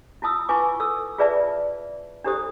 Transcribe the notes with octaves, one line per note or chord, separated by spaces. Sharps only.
E4 F4 A5 D#6 E6
E4 F4 B4 G#5 C#6 D6
A4 E6
F4 G#4 B4 D5 E5 A5
D4 E4 G4 A4 C5 D#6